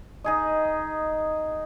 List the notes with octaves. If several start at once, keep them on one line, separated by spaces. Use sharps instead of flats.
D#4 G#4 D#5